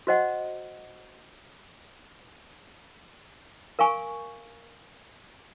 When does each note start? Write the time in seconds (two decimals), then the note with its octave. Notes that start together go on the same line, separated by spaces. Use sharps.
0.07 F#4 C5 D#5 F#5
3.79 A#4 F5 G#5 C#6